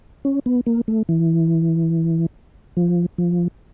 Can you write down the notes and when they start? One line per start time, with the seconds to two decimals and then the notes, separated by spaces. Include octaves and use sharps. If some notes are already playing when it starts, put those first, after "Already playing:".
0.25 C#4
0.46 B3
0.66 A#3
0.88 A3
1.09 E3
2.77 F3
3.18 F3